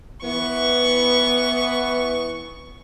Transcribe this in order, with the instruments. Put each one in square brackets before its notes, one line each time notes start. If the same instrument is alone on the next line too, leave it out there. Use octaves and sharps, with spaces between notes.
[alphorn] E3 [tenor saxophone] B3 [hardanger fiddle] C#6